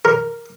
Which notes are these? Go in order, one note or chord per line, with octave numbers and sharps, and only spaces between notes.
A#4